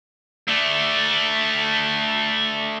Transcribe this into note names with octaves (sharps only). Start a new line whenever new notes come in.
A3 D4